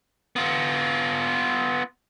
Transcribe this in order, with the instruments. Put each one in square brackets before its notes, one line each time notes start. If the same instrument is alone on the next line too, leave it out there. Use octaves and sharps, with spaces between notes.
[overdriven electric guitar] B3 F4